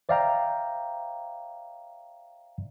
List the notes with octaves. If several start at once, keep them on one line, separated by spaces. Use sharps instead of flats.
C5 D5 E5 F5 G5 A#5